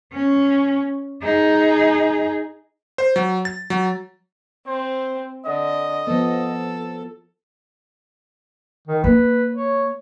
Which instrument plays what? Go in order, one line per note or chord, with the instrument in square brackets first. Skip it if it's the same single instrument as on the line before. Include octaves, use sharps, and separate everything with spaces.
[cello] C#4
D#4 G#4
[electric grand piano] C5
F#3
A6
F#3
[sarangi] C4 [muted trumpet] C5
[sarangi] D3 [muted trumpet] D#5
[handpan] F3 B3 [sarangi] A4
[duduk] D#3
[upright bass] A#3 [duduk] B4
[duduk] C#5